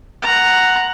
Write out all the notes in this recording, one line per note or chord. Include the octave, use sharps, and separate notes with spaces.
F#5 A#5